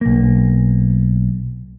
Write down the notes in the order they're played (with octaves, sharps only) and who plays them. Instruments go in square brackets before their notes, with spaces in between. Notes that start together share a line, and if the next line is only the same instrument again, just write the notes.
[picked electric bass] B1 A#3